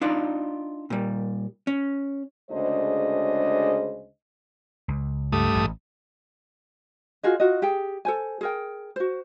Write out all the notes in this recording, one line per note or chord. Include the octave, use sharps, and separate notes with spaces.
D4 D#4 F4 D5
A#2 G3
C#4
D2 C#3 G#3 D4 C5 D#5
C#2
G2 A3 D#6
A1
F4 F#4 G#4 D#5
F4 F#4 D#5
G4 G#4 G5
A4 C5 G#5
G#4 A#4 G5
F#4 C5